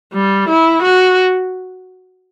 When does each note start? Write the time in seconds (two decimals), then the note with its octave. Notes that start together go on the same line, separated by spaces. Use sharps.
0.13 G3
0.49 E4
0.82 F#4